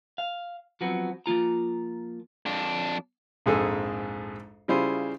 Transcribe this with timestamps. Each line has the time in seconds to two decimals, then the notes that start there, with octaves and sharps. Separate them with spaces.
0.18 F5
0.81 F3 F#3 B3 C4 F#4
1.26 F3 A#3 F4 A#5
2.46 F2 D4
3.46 A#1 F2 G#2 G#4 A4
4.68 C#3 G3 E4 F4 G#4 C5